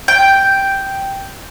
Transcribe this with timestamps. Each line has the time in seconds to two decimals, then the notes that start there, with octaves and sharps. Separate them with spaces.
0.08 G5